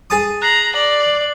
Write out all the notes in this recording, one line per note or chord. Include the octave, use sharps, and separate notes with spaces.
G#4 A5 D#6
A#5 F#6 C7 F#7
D5 F#7